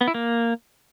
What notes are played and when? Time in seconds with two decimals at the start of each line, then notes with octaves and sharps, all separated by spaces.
0.01 B3
0.08 E4
0.14 A#3